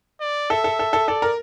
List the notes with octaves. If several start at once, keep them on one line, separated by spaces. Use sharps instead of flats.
D5
A4 E5
A4
A4
A4
A4 D5
A#4